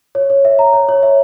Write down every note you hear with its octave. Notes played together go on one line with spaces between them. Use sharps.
C#5
C#5
E5
A#5
C#5
C#5
E5